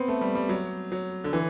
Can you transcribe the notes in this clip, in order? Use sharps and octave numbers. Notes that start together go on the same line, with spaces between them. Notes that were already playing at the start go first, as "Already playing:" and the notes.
Already playing: B3 C4
A3
G3
G3
F#3
F#3
D3
E3